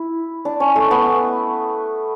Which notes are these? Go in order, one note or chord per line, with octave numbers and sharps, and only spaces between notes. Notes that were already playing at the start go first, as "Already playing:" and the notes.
Already playing: E4
D4
C#4
A3
B3